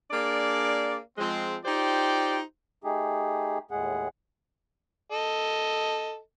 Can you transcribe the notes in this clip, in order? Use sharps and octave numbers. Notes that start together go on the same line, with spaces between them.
A#3 D4 G#4 D5
F3 G#3 C4
D#4 F4 G4 C5 D5 G5
A3 D#4 G4 G#4
D#2 A2 G#3 G#4 F#5
A4 D#5